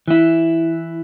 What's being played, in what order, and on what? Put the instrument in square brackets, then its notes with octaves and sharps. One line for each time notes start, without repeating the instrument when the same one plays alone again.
[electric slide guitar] E3 E4